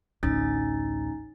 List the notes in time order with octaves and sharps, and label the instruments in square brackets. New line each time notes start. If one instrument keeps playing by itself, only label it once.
[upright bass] A1 D2 [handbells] C#4 D#4 A6